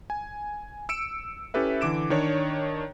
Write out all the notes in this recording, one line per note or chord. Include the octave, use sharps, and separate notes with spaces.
G#5
E6 C#7 D7 E7
C#4 E4 G4 A4 B4 E5
D3 E3 D6 D7 E7
D#3 D4 C#5